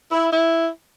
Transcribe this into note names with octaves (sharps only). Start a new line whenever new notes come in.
E4
E4